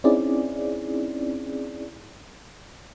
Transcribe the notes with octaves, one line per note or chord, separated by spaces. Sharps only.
C4 C#4 D#4 E4 G#4 D5